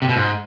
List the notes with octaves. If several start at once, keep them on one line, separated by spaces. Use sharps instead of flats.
C3
B2
G#2